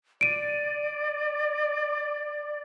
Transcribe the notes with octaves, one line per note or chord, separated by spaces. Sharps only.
D5 D7 D#7